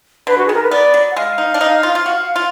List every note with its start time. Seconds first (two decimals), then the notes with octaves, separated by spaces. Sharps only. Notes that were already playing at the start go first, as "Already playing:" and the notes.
0.27 D3 B4
0.38 F#4
0.46 D#3 G#4
0.54 A#4
0.63 B4
0.71 B3 D5
0.94 F#3
1.11 F#5
1.16 G#3 F5
1.38 D#4
1.54 D4
1.61 D#4
1.83 F4
1.95 F4
2.06 F#4
2.36 F4